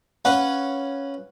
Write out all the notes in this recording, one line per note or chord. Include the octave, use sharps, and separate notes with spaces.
C#4 B4 F5 F#5 C#6